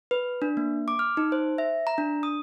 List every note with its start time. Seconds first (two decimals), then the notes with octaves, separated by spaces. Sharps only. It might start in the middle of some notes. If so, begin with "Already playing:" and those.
0.11 B4
0.42 D4
0.57 A#3
0.88 D6
0.99 F6
1.17 D#4
1.32 C5
1.58 E5
1.87 A#5
1.98 D4
2.23 D#6